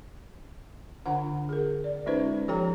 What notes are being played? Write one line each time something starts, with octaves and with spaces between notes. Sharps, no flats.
D3 D4 F4 C5 F#5 A#5
G#4 A#4
D5
G#3 C#4 D#4 F4 B4 C5
F3 G4 A4 C#5 G5 A#5